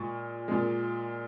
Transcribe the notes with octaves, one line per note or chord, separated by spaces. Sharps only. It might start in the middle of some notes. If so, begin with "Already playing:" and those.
Already playing: A#2 G#3 C#6
A#2 G#3